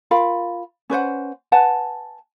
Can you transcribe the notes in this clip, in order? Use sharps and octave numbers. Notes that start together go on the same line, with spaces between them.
F4 A#4 F5 B5
C#4 B4 C5 F#5
B4 F#5 G#5 A5